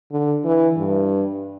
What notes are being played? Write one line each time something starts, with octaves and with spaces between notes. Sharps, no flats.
D3
E3
G2